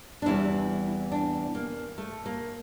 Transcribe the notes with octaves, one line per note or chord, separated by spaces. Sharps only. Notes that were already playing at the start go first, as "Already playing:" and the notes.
D4
E2 C3 E3 G3 E4
D4
A#3
A3
A#3